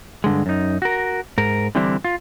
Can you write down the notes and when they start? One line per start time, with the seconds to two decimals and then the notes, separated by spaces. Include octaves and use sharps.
0.24 G2 D3 G#3
0.46 F#2 D#4
0.82 F#4 A#4
1.38 G#2 A#4
1.75 D3 E3 G3 C4 D4 E4
2.04 F4